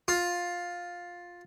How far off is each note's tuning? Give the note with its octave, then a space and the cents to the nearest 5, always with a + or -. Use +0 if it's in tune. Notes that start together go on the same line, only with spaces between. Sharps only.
F4 +10